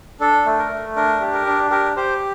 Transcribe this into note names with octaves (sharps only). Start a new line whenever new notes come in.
D4 A4
A3
A#4
A3
D4 A#4
G4
A#4
D4
G4 A#4
G4 C5